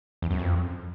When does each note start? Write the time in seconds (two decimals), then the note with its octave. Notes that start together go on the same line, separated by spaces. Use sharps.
0.22 E2
0.31 F#2
0.39 F2